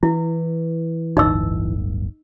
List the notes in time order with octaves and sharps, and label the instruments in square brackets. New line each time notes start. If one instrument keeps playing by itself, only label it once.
[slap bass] E3 [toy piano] E4
[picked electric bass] D1 G1 [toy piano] D#4 D#5 E6